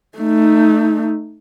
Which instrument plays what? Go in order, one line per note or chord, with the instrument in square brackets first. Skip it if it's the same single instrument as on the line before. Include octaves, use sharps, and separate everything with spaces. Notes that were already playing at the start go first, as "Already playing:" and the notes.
[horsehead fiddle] A3 D#4